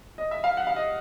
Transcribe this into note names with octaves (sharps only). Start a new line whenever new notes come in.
D#5
E5
F5
F#5
F5
D#5